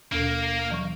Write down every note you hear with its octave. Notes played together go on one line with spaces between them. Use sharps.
D#2 B2 A#3
E3 F#3 C#6